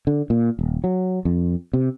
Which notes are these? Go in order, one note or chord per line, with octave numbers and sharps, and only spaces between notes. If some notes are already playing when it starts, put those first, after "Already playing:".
D3
A#2
D#1
F#3
F2
C3